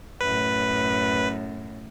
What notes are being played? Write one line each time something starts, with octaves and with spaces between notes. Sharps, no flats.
F#2 A2 B4